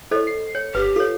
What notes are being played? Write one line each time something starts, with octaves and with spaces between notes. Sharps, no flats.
E4 A4 C5 C#5 D#5
C7
C#5 C#7
G1 G4 B4
F4 A4 C#5